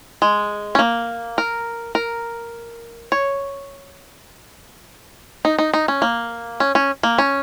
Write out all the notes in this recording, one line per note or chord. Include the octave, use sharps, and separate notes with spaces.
G#3
C#4
A#3
A#4
A#4
C#5
D#4
D#4
D#4
C#4
A#3
C#4
C#4
A#3
C#4